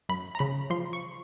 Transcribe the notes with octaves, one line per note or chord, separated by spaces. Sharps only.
F#2 B5
A#5
C#3 B5
F3 C6
C#6